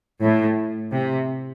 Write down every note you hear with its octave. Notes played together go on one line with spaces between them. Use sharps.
A2
C3